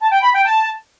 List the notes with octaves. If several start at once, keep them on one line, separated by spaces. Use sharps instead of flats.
A5
G5
B5
G5
A5